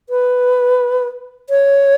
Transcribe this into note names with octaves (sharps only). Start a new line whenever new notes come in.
B4
C#5